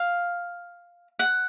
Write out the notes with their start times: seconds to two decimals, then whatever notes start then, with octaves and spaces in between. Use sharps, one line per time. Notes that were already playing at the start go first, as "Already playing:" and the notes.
Already playing: F5
1.19 F#5